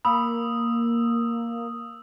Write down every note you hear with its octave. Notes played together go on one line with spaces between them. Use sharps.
A#3 B5 D#6 E6